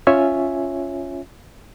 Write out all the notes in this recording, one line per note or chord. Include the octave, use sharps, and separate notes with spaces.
C#4 F4 C#5 E5 G#5